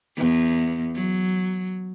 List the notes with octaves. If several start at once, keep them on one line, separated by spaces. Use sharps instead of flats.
E2
F#3